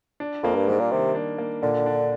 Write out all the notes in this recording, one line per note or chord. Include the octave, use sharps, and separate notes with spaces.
D4
F2 A#3
G2
G#2 G3
A#2
C3 D#3
D4
A#3
A#2 D3
D4